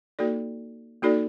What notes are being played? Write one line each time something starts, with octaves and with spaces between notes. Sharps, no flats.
A#3 D#4 F#4 A4 D5
A#3 D#4 F#4 A4 D5